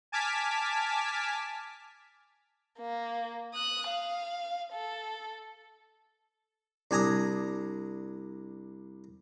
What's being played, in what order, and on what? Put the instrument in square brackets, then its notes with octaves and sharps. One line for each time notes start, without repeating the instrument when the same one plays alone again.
[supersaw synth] G#5 A5 D6 F6 G#6 B6
[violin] A#3
D#6 F#6
F5
A4
[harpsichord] C2 D4 G#5 A#5 D#6